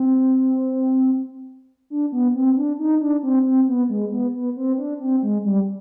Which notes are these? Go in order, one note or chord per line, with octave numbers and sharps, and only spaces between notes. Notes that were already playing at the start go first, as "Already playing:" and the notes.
Already playing: C4
D4
B3
C4
D4
D#4
D4
C4
C4
B3
G#3
B3
B3
C4
D4
C4
G#3
G3